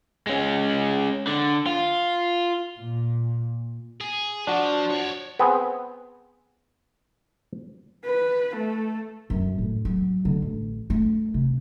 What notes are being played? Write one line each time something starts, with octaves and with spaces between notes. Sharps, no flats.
G#3 C#4
D3
F4
A#2
G#4
F3 D4 F#4
C#5 D5
B3 C4 G#4
B4
A3
F#2
A2
F#3
D3
A1
A3
C3